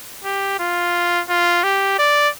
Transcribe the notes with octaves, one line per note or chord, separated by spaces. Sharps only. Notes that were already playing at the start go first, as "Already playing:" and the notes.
G4
F4
F4
G4
D5